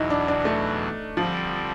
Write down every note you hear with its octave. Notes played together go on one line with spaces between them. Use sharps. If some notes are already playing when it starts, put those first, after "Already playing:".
Already playing: E2 B2 F#3 D#4 E4
D4
D4
A3
D3 F3 G3 C4